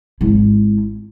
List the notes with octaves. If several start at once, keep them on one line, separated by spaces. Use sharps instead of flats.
G#1 E4